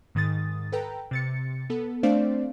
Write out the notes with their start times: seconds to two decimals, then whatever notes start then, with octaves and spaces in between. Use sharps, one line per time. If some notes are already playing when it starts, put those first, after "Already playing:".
0.15 G#2 D#3 D#6 A6
0.72 A4 B4 G5 A#5
1.11 C3 A6 C#7
1.70 B3 A4
2.03 A3 C4 D4 C5 D5 F5